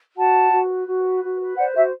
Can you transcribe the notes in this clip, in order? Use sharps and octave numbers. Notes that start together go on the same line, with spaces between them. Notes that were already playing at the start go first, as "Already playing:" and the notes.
F#4 F#5 A5
B4
F#4
B4
F#4
B4
F#4
B4
C5 D5 F#5
F#4 E5